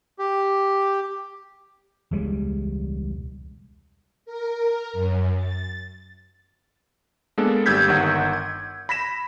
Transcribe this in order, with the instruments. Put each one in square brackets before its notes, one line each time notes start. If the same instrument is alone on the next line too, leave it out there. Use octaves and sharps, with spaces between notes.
[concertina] G4
[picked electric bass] E1 C#2 G3 G#3
[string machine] A#4
F#2
A6
[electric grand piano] G#3 A#3 B3 D4 A4
G#1 G3 E6 G6 G#6 B6
G1 D#3 F#5
G#6
B5 A#6 B6 E7